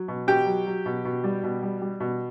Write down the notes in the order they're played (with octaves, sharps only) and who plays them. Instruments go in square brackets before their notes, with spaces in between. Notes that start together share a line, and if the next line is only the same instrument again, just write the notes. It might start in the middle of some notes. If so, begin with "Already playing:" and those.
Already playing: [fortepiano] F#3
B2
B2 G4 G5
F#3
F#3
B2
B2
G3
B2
G3
G3
B2